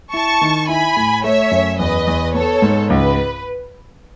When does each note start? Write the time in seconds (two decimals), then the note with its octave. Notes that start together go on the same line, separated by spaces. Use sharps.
0.13 E4 A5 C#6
0.41 D#3
0.68 E4 G#5 B5
0.97 A2
1.23 A3 C#5 E5
1.51 F#2
1.79 E2 B4 D#5
2.07 E2
2.34 B3 A4 C#5
2.62 G#2
2.90 C#2 B4